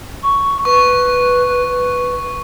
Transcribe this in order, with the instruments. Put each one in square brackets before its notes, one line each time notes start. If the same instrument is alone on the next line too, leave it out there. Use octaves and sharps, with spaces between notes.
[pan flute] C#6
[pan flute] B4 [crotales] C#6